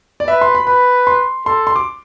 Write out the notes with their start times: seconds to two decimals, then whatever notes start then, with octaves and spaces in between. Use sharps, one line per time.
0.20 D5
0.28 B4 E5
0.41 C6
0.55 B5
0.67 B4 B5
1.07 C6
1.46 A4 C6
1.67 C6
1.76 D6